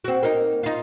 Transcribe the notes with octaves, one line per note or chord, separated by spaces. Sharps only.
C4 F#4
A#3 D#4
D#4 F4